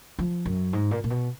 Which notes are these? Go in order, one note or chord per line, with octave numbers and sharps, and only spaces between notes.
F3
F#2
G#2
A#2
A#2
B2